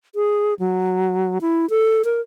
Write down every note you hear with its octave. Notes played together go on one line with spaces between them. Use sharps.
G#4
F#3
E4
A4
A#4